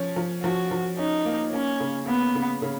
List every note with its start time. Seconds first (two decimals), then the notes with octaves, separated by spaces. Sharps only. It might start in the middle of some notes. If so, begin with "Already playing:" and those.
Already playing: F3 C#4
0.16 F3
0.43 F3 F#4
0.71 F3
0.98 C#4 D#4
1.25 A#3
1.52 A#3 C#4
1.80 C#3
2.07 A#3 B3
2.35 C#3
2.62 C#3